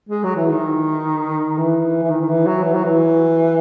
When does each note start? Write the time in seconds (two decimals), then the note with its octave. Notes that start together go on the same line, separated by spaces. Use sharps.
0.09 G#3
0.24 F#3
0.36 E3
0.50 D#3
1.58 E3
2.02 E3
2.10 D#3
2.21 D#3
2.28 E3
2.47 F#3
2.64 E3
2.75 F#3
2.85 E3